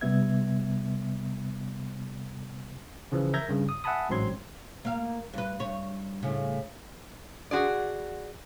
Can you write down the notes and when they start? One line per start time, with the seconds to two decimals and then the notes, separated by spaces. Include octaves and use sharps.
0.01 C3 G3 B3 E5 G#6
3.12 C#3 E3 F3
3.34 A#4 E5 F6 G6 G#6 A#6
3.49 G2 C#3
3.69 D#6
3.84 E5 F#5 G#5 A5 B5 D#6
4.09 A1 G#2 F#3 C4 C6 G#6
4.85 A#3 F5
5.33 G2 B4
5.60 G2 C#5
6.23 A2 C#3
7.51 F#4 G#4 D5